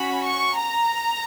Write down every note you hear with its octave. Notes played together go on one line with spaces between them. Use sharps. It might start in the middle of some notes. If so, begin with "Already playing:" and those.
Already playing: C#4 F#4 B5
C#6
A#5